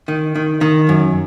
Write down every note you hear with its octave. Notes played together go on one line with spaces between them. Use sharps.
D#3
D#3
D#3
F#2